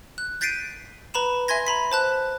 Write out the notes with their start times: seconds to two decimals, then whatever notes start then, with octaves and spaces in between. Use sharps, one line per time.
0.18 F#6
0.41 G6 A6 B6 C7 D7 D#7
1.14 B4 A#5 B5 E7
1.48 E5 G#5 C6 G#6 A#6
1.67 A#5 B5 B6
1.92 C5 A5 F#6